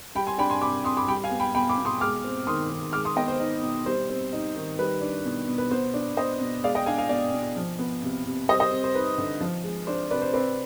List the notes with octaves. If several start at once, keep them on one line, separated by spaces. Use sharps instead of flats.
G3 G5 B5
G#5 C6
D4 G5 B5
G#5 C6
C3 B5 D6
C3 C6 D#6
B5 D6
G3 G5 B5
F5 G#5
B3
G5 B5
B2 G5 B5
B5 D6
B2
C6 D#6
G#3 D6 F6
C4
D#3 C6 D#6
D#3
G#3 D6 F6
C6 D#6
B3 D#5 G5
C5
D#4
B2
G3 C5
C4
D#4
D#3
G3 B4
D4
B2
B2
B4
B3 C5
D4
B2 C5 D#5
B2
G#3 D5 F5
D#5 G5
D4 F5 G#5
F5 G#5
B2 D5 F5
B2
F3
B3
C3
C3
G3 C5 D#5
C5 D#5
C4
C5
D#4 B4
D3
F3
G#3
D4 C5
C3 B4 D5
C5
C4 B4 D5